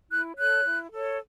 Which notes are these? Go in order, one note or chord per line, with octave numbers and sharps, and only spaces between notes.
E4 F#6
A4 C#5 F#6
E4
A4 C#5